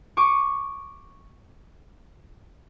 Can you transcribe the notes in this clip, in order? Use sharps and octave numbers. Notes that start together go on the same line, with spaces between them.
C#6 D6 C#7 D#7